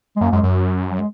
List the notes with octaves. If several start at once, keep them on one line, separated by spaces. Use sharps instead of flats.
G#3
F#2 A#3
F#2 G#3
F#2
F#3
G#3